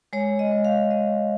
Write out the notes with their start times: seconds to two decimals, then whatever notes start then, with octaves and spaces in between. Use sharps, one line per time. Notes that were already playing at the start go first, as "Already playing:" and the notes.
0.13 G#3 C#5
0.39 D#5
0.52 G#3
0.65 F5
0.90 G#3 D#5